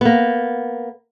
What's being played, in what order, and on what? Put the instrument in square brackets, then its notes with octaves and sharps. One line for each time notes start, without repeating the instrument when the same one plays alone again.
[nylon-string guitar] A#3 B3